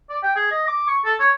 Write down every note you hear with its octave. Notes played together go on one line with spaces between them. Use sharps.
D5
G5
G#4
D#5
D6
C#6
A4
C#5